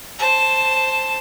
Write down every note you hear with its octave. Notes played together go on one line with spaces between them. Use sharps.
C5 A5